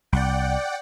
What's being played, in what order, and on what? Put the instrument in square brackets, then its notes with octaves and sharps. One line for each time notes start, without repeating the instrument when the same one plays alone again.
[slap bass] C2 [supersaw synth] D5 F#5 G5